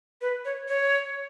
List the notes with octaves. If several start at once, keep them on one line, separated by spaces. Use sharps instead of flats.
B4
C#5
C#5